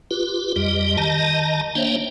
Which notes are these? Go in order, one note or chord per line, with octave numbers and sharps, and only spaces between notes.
F4 G4 B4
F2 G3 G4 D#5
D#3 D#5 A5 A#5
A#3 D4 C5 C#5 E5 G5